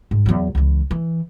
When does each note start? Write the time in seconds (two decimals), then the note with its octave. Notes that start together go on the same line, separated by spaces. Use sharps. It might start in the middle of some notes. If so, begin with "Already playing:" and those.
0.11 G#2
0.26 E2 F#3
0.55 C#2 E3
0.91 E3